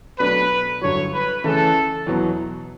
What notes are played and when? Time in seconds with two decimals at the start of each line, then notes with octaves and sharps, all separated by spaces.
0.20 B2 F#3 A3 D4 B4
0.82 G2 D3 F#3 C#5
1.13 B4
1.44 C#3 E3 A3 C#4 E4 A4
2.07 E2 B2 F#3 B3